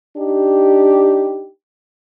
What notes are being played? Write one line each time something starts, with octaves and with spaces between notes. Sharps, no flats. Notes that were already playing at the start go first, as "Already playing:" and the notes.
D4 D#4 G4